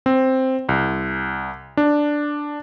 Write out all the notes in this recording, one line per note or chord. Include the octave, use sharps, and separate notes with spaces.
C4
C2
D4